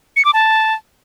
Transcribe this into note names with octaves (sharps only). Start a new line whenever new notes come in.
C#7
D6
A5